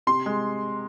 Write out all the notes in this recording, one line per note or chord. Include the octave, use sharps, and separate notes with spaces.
C3 C6
G#3